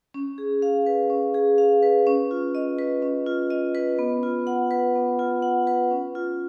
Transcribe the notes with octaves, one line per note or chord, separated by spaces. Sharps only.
C#4
G#4
F5
B4
C#4
G#4
F5
B4
C#4
F4
D#5
B4
C#4
F4
D#5
B4
B3
F4
F#5
B4
B3
F4
F#5
B4
C#4
F4